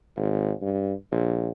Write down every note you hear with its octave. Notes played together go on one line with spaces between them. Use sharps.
G#1
G2
A#1